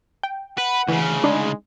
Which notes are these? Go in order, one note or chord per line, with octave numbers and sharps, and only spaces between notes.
G5
B4 F#5
D2 C#3 E3
G#3 D4 D#4